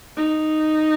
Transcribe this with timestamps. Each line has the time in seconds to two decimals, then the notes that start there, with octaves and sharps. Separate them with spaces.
0.17 D#4